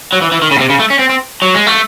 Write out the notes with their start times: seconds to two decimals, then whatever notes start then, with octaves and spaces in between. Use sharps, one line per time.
0.13 F#3
0.22 E3
0.32 E3
0.42 D#3
0.51 C#3
0.56 A2
0.60 C3
0.70 C#3
0.79 A3
0.90 C#4
0.99 C4
1.09 C4
1.42 F#3
1.55 G#3
1.67 A3